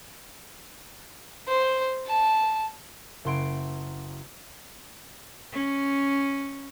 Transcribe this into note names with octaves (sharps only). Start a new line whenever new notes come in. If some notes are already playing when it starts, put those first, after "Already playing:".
C5
A5
F#1 E4 F#5 C6 C7 D7
C#4